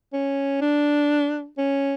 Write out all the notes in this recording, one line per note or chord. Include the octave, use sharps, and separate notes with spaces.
C#4
D4
C#4